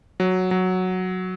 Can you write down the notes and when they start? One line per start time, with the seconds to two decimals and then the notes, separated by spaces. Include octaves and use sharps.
0.20 F#3
0.51 F#3